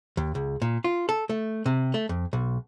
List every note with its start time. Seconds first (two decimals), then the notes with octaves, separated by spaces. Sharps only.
0.17 D#2
0.35 C#2
0.62 A#2
0.84 F4
1.09 A4
1.29 A3
1.66 C3
1.94 A3
2.09 F2
2.33 B1